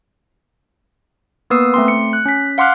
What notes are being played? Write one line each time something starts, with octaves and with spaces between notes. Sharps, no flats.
A#3 B3 B4 D#6 E6 C7
A3 C4 C6
C#7
F#6
C#4 B6
F5 F#5 C6 D6 F6 F#6